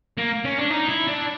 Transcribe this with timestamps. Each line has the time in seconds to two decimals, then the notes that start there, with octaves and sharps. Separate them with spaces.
0.18 A#3
0.45 C#4
0.58 D4
0.71 D#4
0.89 E4
1.07 D4